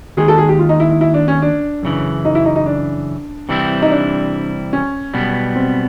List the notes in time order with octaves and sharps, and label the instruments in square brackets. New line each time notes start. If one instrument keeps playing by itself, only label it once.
[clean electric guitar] D#2 D#3 G#3 [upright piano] G#4
[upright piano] A4
G#4
G4
F4
D#4
E4
E4
E4
D4
C#4
D4
[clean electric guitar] F#2 C#3 E3
[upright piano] D#4
E4
D#4
D#4
D4
[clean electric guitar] C3 E3 G3 C4 E4
[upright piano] D#4
D4
C#4
[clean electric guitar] B1 B2 G3 B3
[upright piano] C4